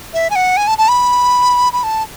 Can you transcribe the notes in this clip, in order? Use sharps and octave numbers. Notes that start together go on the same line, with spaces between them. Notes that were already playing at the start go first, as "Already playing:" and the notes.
E5
G#5
F#5
G#5
A5
A5
B5
B5
A5